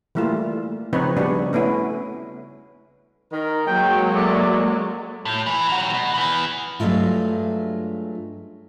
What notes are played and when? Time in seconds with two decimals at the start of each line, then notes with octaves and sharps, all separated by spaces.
0.15 E3 G3 A3 A#3 F4
0.93 C#3 F3 C4 D#4 B4 C#5
1.17 C#3 G3 B3 D4 F#4
1.53 A3 B3 C#4 E4
3.32 D#3 A#4
3.67 F#3 G#3 A#3 G5
4.16 F#2 A3 D5
5.25 A2
5.46 E3
5.69 D#3 F#4
5.94 B2
6.14 E3 B3
6.80 G2 F#3 G#3 A3 F4